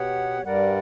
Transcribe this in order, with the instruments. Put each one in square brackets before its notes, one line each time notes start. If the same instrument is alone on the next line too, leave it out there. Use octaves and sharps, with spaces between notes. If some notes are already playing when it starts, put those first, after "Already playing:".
Already playing: [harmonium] B2 B3 [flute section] G4 C#5 F#5
[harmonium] G2 G3 [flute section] A#4 D5 F#5